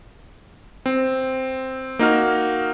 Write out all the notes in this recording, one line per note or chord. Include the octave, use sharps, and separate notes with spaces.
C4
A#3 D#4 F#4 F6